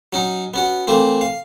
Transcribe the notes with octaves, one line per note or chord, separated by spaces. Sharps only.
F#3 C#4 D#4
B3 C#4 F#4
E3 A3 A#3 C4
F5